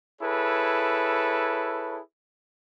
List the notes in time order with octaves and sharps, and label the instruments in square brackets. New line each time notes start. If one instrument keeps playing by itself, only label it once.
[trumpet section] E4 G#4 A4 B4 C#5